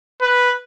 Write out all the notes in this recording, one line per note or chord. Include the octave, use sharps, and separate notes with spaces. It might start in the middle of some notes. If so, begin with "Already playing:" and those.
B4